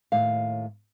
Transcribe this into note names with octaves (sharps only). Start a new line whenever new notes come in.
D#2 A2 F5